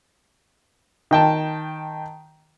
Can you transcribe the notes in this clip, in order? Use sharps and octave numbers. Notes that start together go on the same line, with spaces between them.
D#3 G5 A5